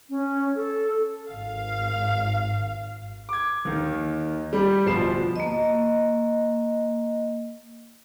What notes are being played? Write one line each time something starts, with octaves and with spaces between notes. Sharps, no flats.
C#4
A4
G#1 F5
D6 G#6
D#2 D#3
G3
D1 B2 F3 B5 C7 E7
A#3 D#5